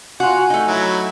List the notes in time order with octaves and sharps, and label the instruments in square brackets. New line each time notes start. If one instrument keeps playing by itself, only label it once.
[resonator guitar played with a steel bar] F4 F#4 [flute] G#5
[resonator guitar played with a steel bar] A3 D#4
[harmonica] F#3 E4